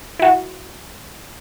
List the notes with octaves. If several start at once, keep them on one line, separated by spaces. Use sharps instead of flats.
E4 F#4